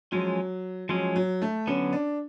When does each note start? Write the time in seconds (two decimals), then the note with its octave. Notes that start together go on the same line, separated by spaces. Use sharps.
0.12 F3 F#3 G#3 C#4
0.89 F3 F#3 G#3 C#4
1.16 F#3
1.42 A3
1.67 D3 F#3 B3 C#4
1.93 D4